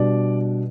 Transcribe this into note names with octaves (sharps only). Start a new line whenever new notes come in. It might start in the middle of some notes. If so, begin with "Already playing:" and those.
Already playing: B2 G3 D4 D5